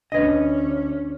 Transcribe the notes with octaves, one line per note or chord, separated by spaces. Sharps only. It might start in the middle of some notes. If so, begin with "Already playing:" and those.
D2 C#4 D4 B4 D#5 G#6